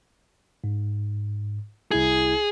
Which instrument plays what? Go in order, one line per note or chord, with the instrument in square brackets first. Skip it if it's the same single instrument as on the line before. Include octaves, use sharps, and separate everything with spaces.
[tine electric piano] G#2
[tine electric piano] C2 E4 G#6 [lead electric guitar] G#4